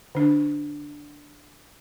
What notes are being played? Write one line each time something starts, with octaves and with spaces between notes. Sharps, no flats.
D3 D4